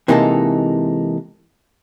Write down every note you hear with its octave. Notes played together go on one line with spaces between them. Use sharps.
C3 E3 G#3 A#3 D#4 A4